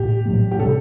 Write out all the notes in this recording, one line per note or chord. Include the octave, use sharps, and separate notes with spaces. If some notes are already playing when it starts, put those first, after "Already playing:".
Already playing: A2 G4
A2 F#3 A#3
G4
C3 G3 C4 A4